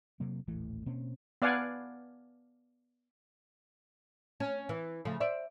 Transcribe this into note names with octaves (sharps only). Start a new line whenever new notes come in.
C3 F#3 A#3
D#1 A1 E3 A3
B2 A#3 C4 C#4
B3 D5 F5 F#5 G#5
C#4
E3
C#3 F3 A3
C5 D5 E5